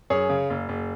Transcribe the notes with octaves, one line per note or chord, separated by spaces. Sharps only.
F#2 G#4 C#5
C#3
F#1
F#1